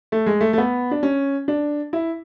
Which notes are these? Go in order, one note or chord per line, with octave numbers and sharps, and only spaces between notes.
A3
G#3
A3
A3
B3
D4
C#4
D4
E4